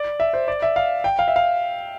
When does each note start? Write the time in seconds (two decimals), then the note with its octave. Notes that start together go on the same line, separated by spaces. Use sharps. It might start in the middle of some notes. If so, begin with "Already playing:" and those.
Already playing: D5
0.20 E5
0.33 C5
0.48 D5
0.62 E5
0.76 F5
1.04 G5
1.19 F5
1.28 E5
1.36 F5